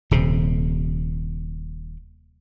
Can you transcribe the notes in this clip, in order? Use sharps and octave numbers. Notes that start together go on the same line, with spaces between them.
D#1 C3